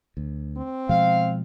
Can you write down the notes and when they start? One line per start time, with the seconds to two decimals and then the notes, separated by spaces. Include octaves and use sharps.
0.17 D2
0.57 C4
0.89 B2 F3 G#3 F5